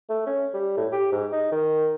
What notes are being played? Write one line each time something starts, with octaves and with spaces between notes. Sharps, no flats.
A3
C#4
G3
A2
G4
G#2
D#4
D#3